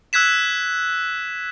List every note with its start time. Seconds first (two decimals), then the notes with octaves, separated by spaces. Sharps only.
0.13 E6 F#6 G#6 B6 E7